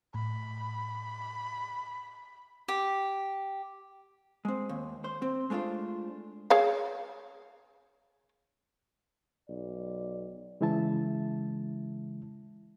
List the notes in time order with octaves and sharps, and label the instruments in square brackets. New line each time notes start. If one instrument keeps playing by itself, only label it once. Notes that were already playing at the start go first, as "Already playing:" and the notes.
[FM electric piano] A2 [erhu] B5
[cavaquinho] G4
[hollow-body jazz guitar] G#3 C4
D#2
C5
C4
G#3 A3 D4 F4 C5
[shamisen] G#4 C#5 F5
[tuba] B1 [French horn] D5
[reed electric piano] C#3 E3 G#3 E4 E5 A5